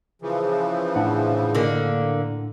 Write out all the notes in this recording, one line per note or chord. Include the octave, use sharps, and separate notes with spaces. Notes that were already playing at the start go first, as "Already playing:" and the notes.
C#3 E3 F3
A2 D4 F#5
D3 A#3